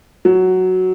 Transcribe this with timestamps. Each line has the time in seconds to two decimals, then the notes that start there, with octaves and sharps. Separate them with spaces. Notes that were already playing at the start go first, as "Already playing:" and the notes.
0.25 F#3